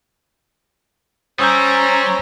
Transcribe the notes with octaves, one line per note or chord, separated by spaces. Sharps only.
G3 C#4 C5 C#5 A#5 D#6 E6 G6